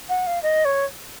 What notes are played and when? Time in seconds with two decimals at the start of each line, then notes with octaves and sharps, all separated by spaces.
0.09 F#5
0.27 F5
0.43 D#5
0.65 C#5